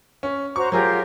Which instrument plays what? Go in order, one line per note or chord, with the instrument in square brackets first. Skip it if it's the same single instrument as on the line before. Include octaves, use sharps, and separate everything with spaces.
[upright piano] C#4
[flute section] F#4 C5 A#5 [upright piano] C#6
[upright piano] F#3 G#4 [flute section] F4 G4 A#4